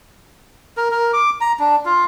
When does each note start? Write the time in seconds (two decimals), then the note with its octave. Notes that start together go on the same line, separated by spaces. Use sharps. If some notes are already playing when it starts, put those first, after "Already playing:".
0.77 A#4
0.91 A#4
1.13 D6
1.41 A#5
1.59 D4
1.86 F4